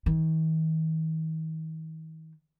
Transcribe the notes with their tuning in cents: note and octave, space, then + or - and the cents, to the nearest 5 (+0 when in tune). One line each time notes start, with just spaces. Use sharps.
D#3 +45